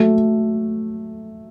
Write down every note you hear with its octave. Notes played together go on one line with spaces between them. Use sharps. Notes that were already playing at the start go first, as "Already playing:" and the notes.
Already playing: F#3 A3